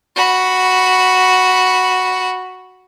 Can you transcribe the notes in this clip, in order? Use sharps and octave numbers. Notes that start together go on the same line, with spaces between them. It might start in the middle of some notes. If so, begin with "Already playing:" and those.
F#4 B5